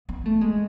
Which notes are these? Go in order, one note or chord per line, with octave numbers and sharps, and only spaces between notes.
B3
A3
G#3